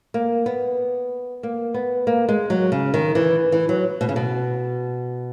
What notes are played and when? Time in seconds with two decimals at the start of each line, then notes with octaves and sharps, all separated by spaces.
0.14 A#3
0.46 B3
1.43 A#3
1.74 B3
2.07 A#3
2.29 G#3
2.50 F#3
2.72 C#3
2.94 D#3
3.15 E3
3.52 E3
3.69 F#3
4.01 B2
4.09 C#3
4.16 B2